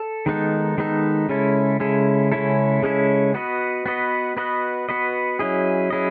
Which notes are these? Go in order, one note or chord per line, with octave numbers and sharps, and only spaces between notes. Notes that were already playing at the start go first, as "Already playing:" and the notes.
Already playing: A4
D#3 G#3 B3 D#4 A4
D#3 G#3 B3 D#4 A4
C#3 G#3 C#4 E4 A4
C#3 G#3 C#4 E4 A4
C#3 G#3 C#4 E4 A4
C#3 G#3 C#4 E4 A4
B3 F#4 B4 D#5
B3 F#4 B4 D#5
B3 F#4 B4 D#5
B3 F#4 B4 D#5
F#3 C#4 E4 G#4 D#5
F#3 C#4 E4 G#4 D#5